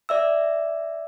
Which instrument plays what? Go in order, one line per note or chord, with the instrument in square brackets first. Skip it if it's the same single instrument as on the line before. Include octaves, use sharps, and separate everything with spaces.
[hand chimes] D5 E5 E6